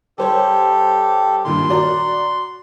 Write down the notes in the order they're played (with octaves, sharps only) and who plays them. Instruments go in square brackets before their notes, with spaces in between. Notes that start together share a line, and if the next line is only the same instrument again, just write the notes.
[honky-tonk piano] G3 C5 C#5 [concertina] G4 A4
[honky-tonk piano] G2 A#2 D#3 [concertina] C6
[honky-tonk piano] F#4 D5 A#5